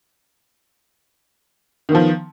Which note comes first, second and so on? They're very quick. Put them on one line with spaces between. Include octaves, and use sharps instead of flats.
D#3 B3 F3